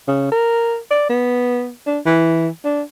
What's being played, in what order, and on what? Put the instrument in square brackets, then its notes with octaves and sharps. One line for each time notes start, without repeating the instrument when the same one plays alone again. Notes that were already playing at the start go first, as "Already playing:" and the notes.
[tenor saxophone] C#3
A#4
D5
B3
D4
E3
D4